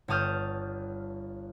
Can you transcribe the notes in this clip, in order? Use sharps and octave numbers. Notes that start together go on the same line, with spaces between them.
G1 C#5 A5 D#6 F6 G6